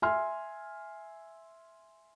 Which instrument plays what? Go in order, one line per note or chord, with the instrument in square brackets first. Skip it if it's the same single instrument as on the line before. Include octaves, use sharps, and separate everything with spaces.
[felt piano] E5 G#5 C6 F6